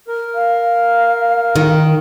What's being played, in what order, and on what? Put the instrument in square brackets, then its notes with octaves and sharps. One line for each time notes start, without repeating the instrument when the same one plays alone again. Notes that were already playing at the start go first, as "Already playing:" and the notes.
[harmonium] A#4
[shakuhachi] F5
[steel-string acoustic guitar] D#3